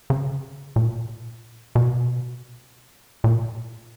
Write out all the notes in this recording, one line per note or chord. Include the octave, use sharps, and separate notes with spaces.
C#3
A#2
B2
A#2